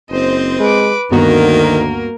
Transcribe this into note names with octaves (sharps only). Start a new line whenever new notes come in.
F#1 C4 C5 D#5
G#3 B4 D6
D2 G2 D#3 A#3 B3 F#4 A#4